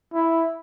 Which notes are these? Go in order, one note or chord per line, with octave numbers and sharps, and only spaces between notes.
E4